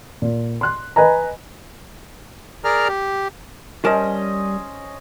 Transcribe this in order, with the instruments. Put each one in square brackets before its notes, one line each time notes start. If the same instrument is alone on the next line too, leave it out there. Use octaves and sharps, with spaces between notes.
[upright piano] A#2
C6 F#6
B4 D#5 G#5 A#5
[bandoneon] G#4 A#4 D5 A#5 F6
G4
[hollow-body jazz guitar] G3 A#4 A5 [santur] C#4 C5 D#5